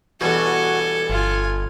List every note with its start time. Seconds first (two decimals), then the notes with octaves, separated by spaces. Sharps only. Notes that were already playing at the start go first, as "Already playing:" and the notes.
0.21 E2 G2 B2 F#4 A4 G#5
1.10 G1 F4 G#5